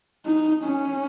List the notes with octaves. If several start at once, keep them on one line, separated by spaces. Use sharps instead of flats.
D#4
C#4